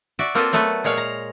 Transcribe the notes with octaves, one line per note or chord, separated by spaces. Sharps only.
F#4 D5 E5
A#3 C4 F4 A4 B4 C5
F#3 A3 B3 A4 B4
A#2 G#3 C#5 F5
A#5